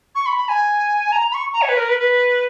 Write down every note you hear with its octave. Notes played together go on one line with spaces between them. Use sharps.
C#6
B5
B5
G#5
A#5
B5
C#6
A#5
C#5
B4
A#4
B4
B4